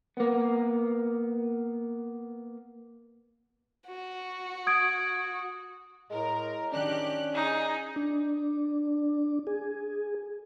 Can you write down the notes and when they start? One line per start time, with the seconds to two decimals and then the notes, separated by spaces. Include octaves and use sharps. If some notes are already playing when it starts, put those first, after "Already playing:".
0.17 A#3 B3
3.88 F#4
4.67 D#6 G#6 D7
6.10 A2 G#3 A#4
6.73 D#3 C#4 D4 G4 F#6
7.34 D#4 G#4
7.96 D4
9.47 G#4